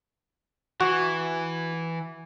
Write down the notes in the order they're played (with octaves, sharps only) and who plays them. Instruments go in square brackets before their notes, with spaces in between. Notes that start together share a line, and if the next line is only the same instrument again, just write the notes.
[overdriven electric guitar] E3 [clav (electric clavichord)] F#4